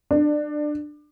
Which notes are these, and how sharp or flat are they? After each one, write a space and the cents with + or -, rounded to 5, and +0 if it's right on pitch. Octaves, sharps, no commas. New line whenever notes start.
D4 +20